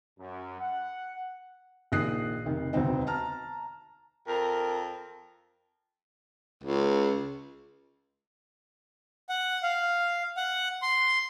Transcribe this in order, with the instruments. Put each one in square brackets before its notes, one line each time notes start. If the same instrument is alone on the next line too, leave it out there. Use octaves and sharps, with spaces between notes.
[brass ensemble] F#2
F#5
[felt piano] A#1 D#3 D#6 F#6 C7
F1 D#3
E1 D2 B3 C4 D#4
A5 A#5 F6
[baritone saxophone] F2 [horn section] A#4
[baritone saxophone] C#2
[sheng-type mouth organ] F#5
F5
F#5
C6